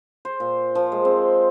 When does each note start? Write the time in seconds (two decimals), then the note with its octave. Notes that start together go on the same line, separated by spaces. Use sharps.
0.25 C5
0.40 A#2
0.75 F3
0.92 G#3
1.05 C4